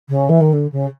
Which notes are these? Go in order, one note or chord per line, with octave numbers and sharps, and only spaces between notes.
C#3
E3
D#3
D3
C#3